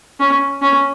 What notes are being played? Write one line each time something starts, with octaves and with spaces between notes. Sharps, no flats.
C#4
C#4